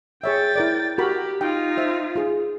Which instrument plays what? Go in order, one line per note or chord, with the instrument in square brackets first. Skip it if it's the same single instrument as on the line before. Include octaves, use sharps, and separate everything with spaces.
[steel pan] G#4 C#5 E5 [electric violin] G5 A6
[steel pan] E4 A#4 D5
[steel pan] F#4 A#4 B5 [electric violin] G4
[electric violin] D#4 F4 [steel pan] G5
[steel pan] C5 E5
F4 G#4